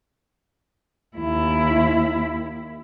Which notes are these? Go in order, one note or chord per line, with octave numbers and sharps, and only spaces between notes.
D#2 E4